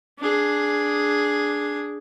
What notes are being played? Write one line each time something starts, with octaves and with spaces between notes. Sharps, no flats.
D4 G#4